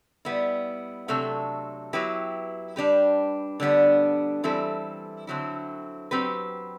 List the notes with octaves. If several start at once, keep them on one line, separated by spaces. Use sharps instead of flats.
G3 B3 E4
C3 F#3 A3 D4 A4
F#3 B3 E4 G4 B4
G3 D4 G4 B4
D3 G3 B3 D4
E3 G3 C4 E4 A4
D3 F#3 C4 E4
F#3 C4 G4 B4